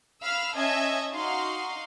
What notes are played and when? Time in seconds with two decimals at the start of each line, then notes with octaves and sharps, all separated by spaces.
0.23 F5 B5 E6 F6
0.55 C#4 D#5 E5 A5 G#6
1.13 D#4 F#4 F5 C6